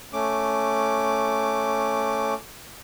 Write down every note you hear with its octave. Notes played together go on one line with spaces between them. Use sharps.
A3 C#4 D6